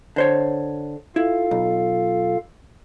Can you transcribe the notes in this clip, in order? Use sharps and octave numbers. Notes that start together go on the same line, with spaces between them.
D3 C5 C#5
E4 F4 A4 F5
B1